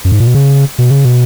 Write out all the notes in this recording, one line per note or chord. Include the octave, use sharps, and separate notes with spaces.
F#2
G#2
A#2
B2
C#3
B2
C#3
B2